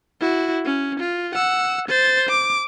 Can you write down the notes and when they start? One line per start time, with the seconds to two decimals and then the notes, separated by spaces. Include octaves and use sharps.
0.20 E4 F#4
0.65 C#4
1.00 F4
1.35 F#5 E6
1.88 C5 A6
2.29 D6